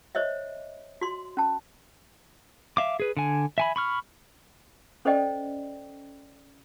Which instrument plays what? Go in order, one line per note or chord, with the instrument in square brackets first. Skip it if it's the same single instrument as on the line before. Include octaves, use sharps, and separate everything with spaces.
[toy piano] C5 C#5 D#5 E5
F#4 C6
C#4 A5
[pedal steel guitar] E5 F5 D6
G#4 B4
D3 G#5
E5 G#5 B5
B5 C#6 F6
[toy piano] C#4 A4 C5 D5 D#5 G5